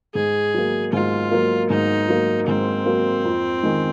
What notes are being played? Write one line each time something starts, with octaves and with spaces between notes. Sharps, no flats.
G#2 G#4
F#3 A#3
G#2 F4
F#3 A#3
G#2 D#4
F#3 A#3
G#2 C4
F#3 A#3
F2
D#3 G#3